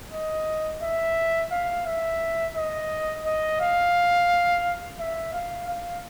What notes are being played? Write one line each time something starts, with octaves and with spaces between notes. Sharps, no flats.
D#5
E5
F5
E5
D#5
D#5
F5
E5
F5
F5